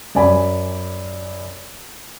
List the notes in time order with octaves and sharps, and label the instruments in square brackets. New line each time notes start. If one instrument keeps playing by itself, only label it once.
[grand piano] F#2 D5 G#5 B5